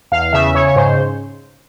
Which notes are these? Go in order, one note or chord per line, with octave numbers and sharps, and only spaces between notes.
E2 F5
C#3 E5
C#3 C#5
C#5
G#2 C5